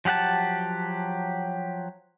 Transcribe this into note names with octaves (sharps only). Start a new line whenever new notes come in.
F3 F#3 G4 F#5 A5